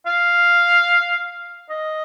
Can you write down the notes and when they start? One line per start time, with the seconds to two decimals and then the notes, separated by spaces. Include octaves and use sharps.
0.06 F5
1.70 D#5